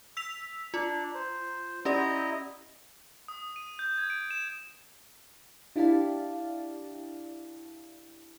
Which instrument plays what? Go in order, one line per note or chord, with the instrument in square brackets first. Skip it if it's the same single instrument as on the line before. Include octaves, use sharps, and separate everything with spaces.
[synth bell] E6 B6 F7
[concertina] D4 [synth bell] F4
[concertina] C5
[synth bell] C#4 G4 D5 [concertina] E4 D#5 A#5
[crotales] D#6
D#7
G6
G#6
D7
E7
[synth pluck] D4 E4 G4 D5 F5 A5